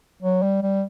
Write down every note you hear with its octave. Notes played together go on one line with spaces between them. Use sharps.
F#3
G3
G3